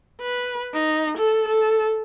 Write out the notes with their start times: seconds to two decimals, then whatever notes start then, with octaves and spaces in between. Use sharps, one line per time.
0.22 B4
0.74 D#4
1.18 A4
1.48 A4